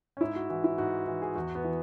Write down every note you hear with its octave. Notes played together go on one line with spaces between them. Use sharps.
C#4
G#2 E4
F#4
E3 F#4
E4
G#2 F#4
E3
G#4
E2 F#4
B3
E3